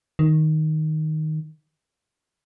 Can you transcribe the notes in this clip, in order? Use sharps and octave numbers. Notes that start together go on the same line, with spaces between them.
D#3